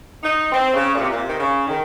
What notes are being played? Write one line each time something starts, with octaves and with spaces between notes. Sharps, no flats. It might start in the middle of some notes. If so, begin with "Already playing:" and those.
D#4
C4
C#3
A#2
C3
A#2
C3
D#3
C#3
D#3